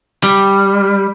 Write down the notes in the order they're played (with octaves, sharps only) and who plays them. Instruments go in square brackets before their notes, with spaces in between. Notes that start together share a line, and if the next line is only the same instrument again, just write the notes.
[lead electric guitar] G3